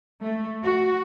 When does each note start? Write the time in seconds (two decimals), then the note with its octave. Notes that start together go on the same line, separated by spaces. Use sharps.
0.23 A3
0.63 F#4